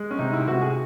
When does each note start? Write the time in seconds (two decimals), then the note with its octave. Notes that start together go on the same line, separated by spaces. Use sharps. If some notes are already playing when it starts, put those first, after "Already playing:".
Already playing: G#3
0.11 C#4
0.19 C3 D#4
0.33 E4
0.48 C3 F#4
0.62 G#4